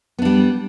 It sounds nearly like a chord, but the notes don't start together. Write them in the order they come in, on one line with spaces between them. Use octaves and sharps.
B3 D4 G3